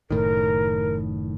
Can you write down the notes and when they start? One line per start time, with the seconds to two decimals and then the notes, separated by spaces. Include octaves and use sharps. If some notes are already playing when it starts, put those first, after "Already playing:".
0.11 F#1 A2 D#3 A#4